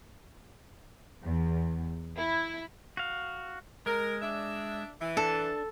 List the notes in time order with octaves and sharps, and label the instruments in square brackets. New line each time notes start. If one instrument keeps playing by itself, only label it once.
[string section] E2
E4
[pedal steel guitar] F#4 F5
[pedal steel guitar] G#3 [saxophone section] A#4
[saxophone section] D4 E5
E3
[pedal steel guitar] D4 [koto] A4